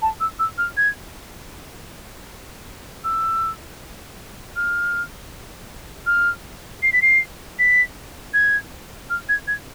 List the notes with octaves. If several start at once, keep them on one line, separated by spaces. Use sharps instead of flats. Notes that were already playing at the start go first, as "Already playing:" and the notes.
A5
E6
E6
F6
G#6
E6
F6
F6
C7
B6
C7
B6
G#6
F6
G#6
G#6